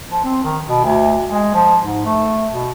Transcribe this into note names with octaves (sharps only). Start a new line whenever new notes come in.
F3
C4
D#3
B2
D2
G#3
F3
G#2
A3
B2